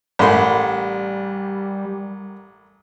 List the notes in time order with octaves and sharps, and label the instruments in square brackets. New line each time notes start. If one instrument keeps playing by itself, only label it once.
[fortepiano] A1 C6 [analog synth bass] G3 [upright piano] A#4 F#5 B5